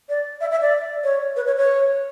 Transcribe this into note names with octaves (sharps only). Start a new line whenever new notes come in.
D5
E5
E5
D5
C#5
B4
C#5
C#5